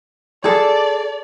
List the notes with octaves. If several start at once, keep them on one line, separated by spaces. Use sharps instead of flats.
G#4 A4 D5